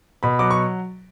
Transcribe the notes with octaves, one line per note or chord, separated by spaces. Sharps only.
B2 B5
F#3 D6
C#6